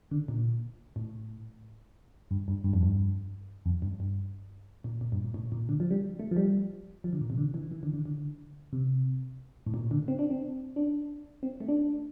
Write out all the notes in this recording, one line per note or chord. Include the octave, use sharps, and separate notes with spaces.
D3
A#2
A2
G2
G2
G2
F2
G2
F2
G2
G2
A#2
A#2
G2
A#2
A2
A#2
D3
F3
G3
A3
F3
G3
F3
D3
A#2
C3
D3
E3
E3
D3
D3
D3
C3
A2
A#2
D3
C4
D4
C4
D4
C4
A3
D4